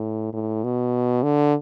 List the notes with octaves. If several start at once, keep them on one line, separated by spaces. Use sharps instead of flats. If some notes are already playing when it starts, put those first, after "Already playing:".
Already playing: A2
A2
B2
D3